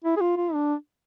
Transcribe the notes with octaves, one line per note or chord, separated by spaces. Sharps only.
E4
G#4
F4
F4
D4